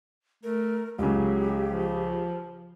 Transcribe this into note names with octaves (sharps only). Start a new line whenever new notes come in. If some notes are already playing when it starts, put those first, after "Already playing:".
A3 A#4
C#2 C#3 F#3 G4
F3